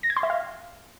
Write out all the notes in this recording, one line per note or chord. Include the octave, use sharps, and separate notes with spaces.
A#6
G#6
C6
E5
F5